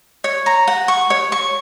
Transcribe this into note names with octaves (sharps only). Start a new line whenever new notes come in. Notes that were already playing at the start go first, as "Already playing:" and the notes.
C#5
A#5
F#5
C#6
C#5
C#6